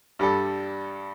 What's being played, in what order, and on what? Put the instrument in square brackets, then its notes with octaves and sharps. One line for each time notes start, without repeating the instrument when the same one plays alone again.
[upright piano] G2 G3 D4 A4